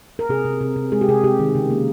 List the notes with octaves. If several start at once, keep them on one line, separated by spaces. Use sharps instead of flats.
A#4
C3 G#4
C3
C3
C3
G#3 G#4
G4
C3 G#4
C3 G4
D#3
C#3
A#3